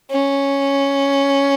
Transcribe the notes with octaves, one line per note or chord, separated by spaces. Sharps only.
C#4